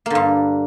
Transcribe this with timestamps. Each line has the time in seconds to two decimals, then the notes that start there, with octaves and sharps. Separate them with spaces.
0.06 A#3
0.10 D3
0.15 G2